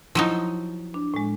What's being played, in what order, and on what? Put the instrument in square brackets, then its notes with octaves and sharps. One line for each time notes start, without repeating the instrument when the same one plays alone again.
[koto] F3 F#3 D#4 [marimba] E4
[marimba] D4
A2 G#3